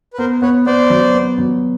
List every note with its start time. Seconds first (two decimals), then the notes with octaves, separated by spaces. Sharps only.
0.13 B4
0.18 B3 A#4 C5
0.42 B3 B4 C#5
0.66 B3 C5 D5
0.90 F#3
1.15 B3
1.38 F#3